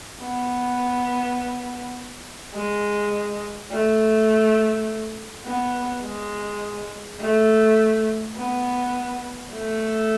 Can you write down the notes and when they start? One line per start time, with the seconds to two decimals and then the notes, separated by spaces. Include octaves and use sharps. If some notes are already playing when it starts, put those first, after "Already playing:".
0.22 B3
2.54 G#3
3.71 A3
5.46 B3
6.03 G#3
7.21 A3
8.36 B3
9.53 A3